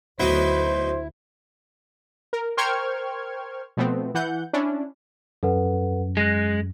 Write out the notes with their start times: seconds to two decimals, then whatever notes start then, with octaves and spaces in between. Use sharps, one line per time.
0.20 D2 F#3 B3 D#4 E4 C5
2.33 A#4
2.57 A#4 C5 G5 C#6 F6 G#6
3.77 B2 F3 A3 B3 C4
4.14 E3 F#5 G6
4.53 C#4 D4 E4
5.43 F#2 A4 B4 F#5
6.17 G#3 F#6 A#6 C7